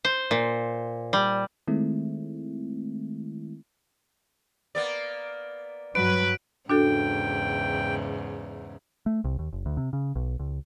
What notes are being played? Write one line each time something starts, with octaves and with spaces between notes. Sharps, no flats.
C5
A#2
G3
D#3 G#3 A3 C4 E4
A#3 B3 D5
G2 F#3 B4 D7
E2 G#2 C#3 D4 F#4 A4 G5
A3
C2
D#2
F#1
D2
C3
C#3
B1
C#2